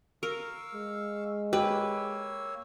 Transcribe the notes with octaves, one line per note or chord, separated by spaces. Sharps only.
A#4 F5 C#6 E6
G#3
A#3 G4 B4 C#5 E6